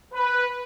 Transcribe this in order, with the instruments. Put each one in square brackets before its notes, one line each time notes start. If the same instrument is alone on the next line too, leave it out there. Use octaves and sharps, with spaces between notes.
[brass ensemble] B4